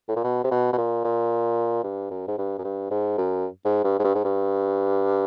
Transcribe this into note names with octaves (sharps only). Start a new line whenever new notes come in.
A2
A#2
B2
C3
B2
B2
A#2
A#2
G2
F#2
G#2
G2
F#2
G2
G#2
F#2
G#2
G2
G#2
G2
G#2
G2